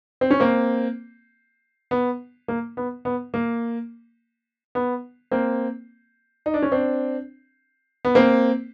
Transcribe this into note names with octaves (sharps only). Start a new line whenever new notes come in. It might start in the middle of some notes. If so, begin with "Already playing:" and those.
C4
C#4
A#3 C4
B3
A#3
B3
B3
A#3
B3
A#3 C4
D#4
D4
C#4
C4 D4
B3
A#3 C4